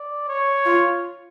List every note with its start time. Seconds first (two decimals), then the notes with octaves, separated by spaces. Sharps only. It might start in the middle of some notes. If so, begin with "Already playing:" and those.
Already playing: D5
0.28 C#5
0.66 F4